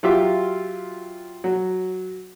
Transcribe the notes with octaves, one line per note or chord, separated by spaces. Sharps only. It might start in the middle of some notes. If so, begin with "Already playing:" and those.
F#3 F4 G4 E5
F#3